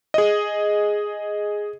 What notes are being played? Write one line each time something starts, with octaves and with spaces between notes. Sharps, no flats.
G#4 D#5